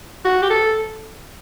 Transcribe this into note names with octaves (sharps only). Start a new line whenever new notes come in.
F#4
G4
A4